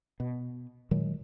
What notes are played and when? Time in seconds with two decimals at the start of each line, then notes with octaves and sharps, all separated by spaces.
0.20 B2
0.91 A#2 D#3 F#3 G#3